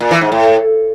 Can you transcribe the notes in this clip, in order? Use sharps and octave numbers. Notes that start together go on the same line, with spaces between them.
A#2
E3
G#2
A2